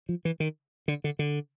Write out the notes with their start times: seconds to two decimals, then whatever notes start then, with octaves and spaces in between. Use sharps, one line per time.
0.09 F3
0.25 E3
0.40 D#3
0.88 D3
1.04 D3
1.19 D3